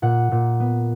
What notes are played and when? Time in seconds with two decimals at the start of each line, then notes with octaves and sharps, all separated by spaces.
0.02 A#2 F#5
0.31 A#2
0.60 B3